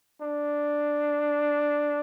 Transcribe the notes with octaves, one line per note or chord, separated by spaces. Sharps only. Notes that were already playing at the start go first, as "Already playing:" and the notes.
D4